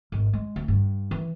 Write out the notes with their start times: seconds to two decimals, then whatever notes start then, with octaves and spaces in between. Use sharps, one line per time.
0.12 G#1
0.33 G#3
0.56 D2
0.68 G2
1.11 E3